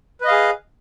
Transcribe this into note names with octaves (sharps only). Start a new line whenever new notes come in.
G#4 B4 D#5 F5